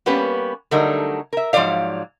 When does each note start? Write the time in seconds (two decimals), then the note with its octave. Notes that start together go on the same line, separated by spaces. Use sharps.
0.06 G3 A#3 B3 C#4 G4 B4
0.71 D3 F#3 G3 A3 D#4 A#4
1.33 A#4 E5
1.53 G#2 F3 F#3 C#5 D5 F5